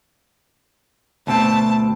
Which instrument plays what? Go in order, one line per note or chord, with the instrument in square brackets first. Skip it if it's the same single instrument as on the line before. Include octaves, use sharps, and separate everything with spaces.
[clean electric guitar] D2 B2 C4 [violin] A5